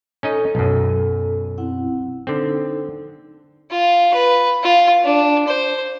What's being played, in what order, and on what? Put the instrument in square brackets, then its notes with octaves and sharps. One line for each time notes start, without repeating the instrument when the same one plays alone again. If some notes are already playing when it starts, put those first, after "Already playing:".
[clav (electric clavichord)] C#4 D#4 D#5 [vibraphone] A4
[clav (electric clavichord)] B1 F#2
[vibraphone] C4 E4 F#5
[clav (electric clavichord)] D3 C4 [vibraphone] D#4 A4
[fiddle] F4
B4
F4
D4
C5